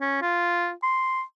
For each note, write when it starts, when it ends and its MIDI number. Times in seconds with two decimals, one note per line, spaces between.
0.01 0.18 61
0.22 0.71 65
0.83 1.22 84